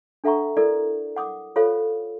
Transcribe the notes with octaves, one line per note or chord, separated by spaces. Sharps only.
D4 A4 E5 F#5 A#5 C#6
E4 A4 A#4 D5
F#5 D6 D#6
F4 A4 C5 C#5 F5